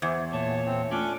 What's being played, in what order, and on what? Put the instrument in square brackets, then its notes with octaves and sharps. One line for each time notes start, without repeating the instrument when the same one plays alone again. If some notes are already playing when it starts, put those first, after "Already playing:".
[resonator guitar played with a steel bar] E2 [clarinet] C5
[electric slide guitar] A#2 [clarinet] C#5 [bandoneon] A5
[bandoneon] C4
[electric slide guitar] A3 [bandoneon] C#4 D4 D6 [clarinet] F4